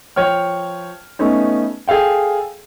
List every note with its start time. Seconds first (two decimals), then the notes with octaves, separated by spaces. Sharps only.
0.16 F3 C#5 G5 F6
1.19 A3 B3 C#4 D#4
1.88 G#4 A4 F5 G5